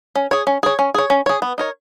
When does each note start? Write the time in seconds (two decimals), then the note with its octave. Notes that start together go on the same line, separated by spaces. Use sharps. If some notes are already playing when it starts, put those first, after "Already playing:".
0.15 C#4
0.31 G#4 C#5
0.47 C#4
0.63 G#4 C#5
0.79 C#4
0.94 G#4 C#5
1.10 C#4
1.26 G#4 C#5
1.42 B3
1.58 D#4 A#4 C#5